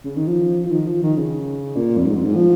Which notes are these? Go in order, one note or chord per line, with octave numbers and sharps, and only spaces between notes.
C#3
D#3
F3
F3
D#3
F3
D#3
C#3
A#2
F2
G#2
F2
G#2
F3